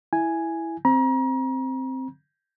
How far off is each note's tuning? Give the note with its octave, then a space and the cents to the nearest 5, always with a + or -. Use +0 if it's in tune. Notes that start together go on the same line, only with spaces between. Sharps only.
E4 +0 G#5 +0
C4 +0 A#5 +35